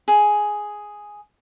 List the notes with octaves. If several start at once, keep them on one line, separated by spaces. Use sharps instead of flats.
G#4